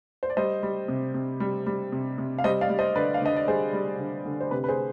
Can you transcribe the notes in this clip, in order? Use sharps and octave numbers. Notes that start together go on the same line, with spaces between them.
C5
D5
G3 C5 D#5
G3
C3
C3
G3
G3
C3
C3
F5
G3 C5 D#5
D5 F5
G3
C5 D#5
D3 B4 D5
F5
D3 D#5
D5
G3 G#4 C5
G3
D3
D3
C5
C3 G4 B4
B4
G#4 C5